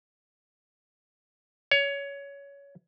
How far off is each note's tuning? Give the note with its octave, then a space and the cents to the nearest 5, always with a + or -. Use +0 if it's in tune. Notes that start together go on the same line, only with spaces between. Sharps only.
C#5 +20